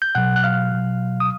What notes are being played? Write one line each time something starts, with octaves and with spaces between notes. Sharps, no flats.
G6
B2 F#3 F#5 F#6
F#6
F5 F6
B2 F#3
D#6